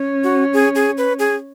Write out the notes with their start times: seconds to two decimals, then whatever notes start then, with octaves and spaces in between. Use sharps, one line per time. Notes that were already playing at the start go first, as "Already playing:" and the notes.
Already playing: C#4
0.24 F#4
0.53 G#4
0.75 G#4
0.98 B4
1.19 G#4